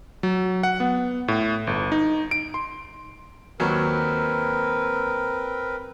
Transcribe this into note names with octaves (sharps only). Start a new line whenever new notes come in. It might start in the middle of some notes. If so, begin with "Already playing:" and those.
F#3
F#5
B3
A2
G1
D#4
D7
C6
D#2 F#3 C4 A#4 B4